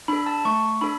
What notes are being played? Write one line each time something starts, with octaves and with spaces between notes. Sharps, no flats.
D4 A4 B5
A5
A3 C#6
D4 A4 B5